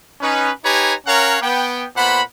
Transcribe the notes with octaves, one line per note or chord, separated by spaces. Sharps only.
C#4 D#4 B4
D#4 G4 B4 C#5 G#5 A#5
C#4 A#4 C#5 F5 F#5 A#5
B3 G5
A#2 B3 C5 F#5 B5